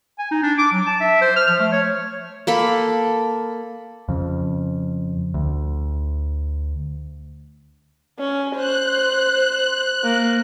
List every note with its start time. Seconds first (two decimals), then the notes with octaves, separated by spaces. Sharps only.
0.19 G#5
0.32 D#4
0.43 D4
0.58 D6
0.73 F#3
0.86 A5
1.01 E5
1.21 C5
1.36 F6
1.48 F3
1.60 A3
1.72 C#5
2.47 A#3 A4 B5
4.09 F2 C#3
5.34 D2
8.20 C#4
8.56 C5 F#6
10.04 A#3